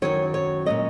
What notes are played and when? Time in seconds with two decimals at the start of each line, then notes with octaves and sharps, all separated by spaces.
0.02 F#2 D#3 F#3 C#5
0.34 C#5
0.66 A#2 F#3 C#4 D#5